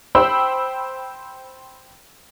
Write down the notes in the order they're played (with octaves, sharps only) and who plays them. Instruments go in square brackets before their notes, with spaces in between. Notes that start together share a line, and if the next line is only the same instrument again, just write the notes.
[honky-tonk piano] C5 G5 B5 E6